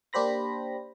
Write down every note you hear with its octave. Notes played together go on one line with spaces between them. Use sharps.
A#3 D4 G4 C5 B5 A#6